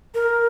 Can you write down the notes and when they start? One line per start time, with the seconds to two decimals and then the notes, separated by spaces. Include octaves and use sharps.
0.14 A#4